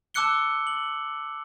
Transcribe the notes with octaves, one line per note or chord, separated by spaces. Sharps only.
A5 D6 E6 F#6 C#7 G7
F#7